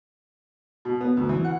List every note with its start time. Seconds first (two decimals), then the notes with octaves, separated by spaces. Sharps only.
0.85 B2
1.01 B3
1.17 D2
1.29 E3
1.44 F#5